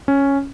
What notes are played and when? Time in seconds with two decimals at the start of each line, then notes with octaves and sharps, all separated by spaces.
0.08 C#4